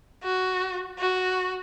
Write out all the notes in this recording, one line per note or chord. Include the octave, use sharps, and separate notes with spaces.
F#4
F#4